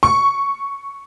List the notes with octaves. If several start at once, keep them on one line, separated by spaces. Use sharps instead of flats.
C#6